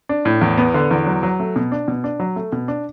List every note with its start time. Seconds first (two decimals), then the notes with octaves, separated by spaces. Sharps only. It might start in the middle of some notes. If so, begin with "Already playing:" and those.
0.09 D4
0.25 A2
0.41 E2
0.58 B3
0.74 D3
0.91 E2
1.06 F#3
1.23 F#3
1.40 A3
1.56 B2
1.72 D4
1.88 B2
2.04 D4
2.20 F#3
2.36 A3
2.52 B2
2.68 D4